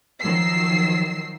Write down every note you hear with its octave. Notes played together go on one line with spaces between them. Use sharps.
D#3 F3 F#3 E6 C7